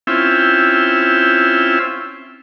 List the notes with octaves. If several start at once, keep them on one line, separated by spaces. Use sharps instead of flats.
C4 C#4 E4 F4 E5 G5